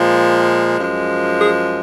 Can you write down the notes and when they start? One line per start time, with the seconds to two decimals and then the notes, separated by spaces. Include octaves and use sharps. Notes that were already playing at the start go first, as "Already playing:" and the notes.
Already playing: A#2 F3 G#3
0.77 F#2 F3 G#3
1.39 G#4